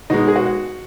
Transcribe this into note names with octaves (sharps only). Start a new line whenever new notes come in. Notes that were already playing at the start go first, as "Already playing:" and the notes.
B2 G#3 D#4
G#4
F#4